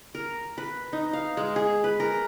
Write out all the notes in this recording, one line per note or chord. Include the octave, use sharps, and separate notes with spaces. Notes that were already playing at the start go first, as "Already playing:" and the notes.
A#4
B4
D#4
F5
G#3
G#4
B4
A#4